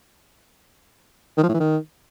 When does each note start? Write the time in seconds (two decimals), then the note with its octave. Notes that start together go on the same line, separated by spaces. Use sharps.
1.38 D#3
1.43 F3
1.49 A2
1.54 E3
1.60 D#3